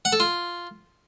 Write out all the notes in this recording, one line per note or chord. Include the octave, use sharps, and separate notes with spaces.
F#5
A4
F4